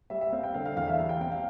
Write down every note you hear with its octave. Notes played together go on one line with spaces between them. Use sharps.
G3 E5
E5
C4 F5
G5
D3 F5
F5
E2 F5
E5
G3 F5
G5
C4 G5
F5